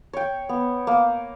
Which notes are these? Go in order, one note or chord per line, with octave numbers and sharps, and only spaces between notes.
C#5 G5
B3
A#3